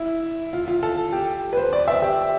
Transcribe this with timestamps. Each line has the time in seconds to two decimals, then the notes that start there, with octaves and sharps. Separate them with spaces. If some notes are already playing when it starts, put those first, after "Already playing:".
Already playing: E4
0.53 F4
0.68 F4
0.83 A4
1.13 G4
1.53 B4
1.57 C5
1.73 D5
1.88 E5
2.02 G4